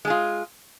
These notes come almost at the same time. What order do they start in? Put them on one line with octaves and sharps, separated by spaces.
G#3 G#4 F4